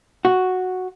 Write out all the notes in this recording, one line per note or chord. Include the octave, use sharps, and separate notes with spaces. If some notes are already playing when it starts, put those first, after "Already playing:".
F#4